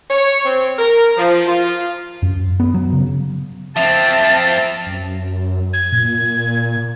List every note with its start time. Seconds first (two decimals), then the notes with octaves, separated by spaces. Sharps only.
0.10 C#5
0.44 C4
0.79 A#4
1.17 F3
1.47 F4
2.22 F#2
2.60 B3
2.74 F#3
2.93 C#3
3.76 F3 C4 E5 A5
4.87 F#2
5.73 G#6
5.92 A#2